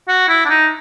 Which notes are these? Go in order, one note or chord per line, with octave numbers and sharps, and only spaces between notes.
F#4
E4
D4
D#4